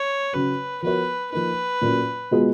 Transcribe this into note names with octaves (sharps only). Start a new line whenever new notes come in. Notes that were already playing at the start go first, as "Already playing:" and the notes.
Already playing: C#5
C#3 F#3 C#4 F#4 B4
F3 B3 F#4 A#4 B4 C#5
F3 A#3 D#4 B4
A#2 F#3 A#3 C#4 F4
B2 G#3 B3 F4 G#4